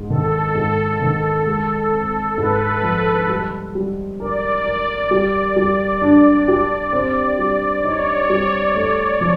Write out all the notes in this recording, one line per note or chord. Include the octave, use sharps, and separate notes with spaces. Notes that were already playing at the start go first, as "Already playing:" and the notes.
Already playing: G#2
D#3 A4
G#2
D#3
G#3
C4
G#2 B4
F3
G3
G3
A#4 D5
A#4
G3
G3
D4
G4
C4
G3
D#4 C#5
G3
A3
F3